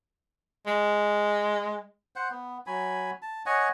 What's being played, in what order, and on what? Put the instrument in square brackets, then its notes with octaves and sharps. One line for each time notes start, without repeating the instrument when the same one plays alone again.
[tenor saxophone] G#3
[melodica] C5 F#5
B3
F#3 G#5 B5
A5
C#5 D#5 F#5 G#5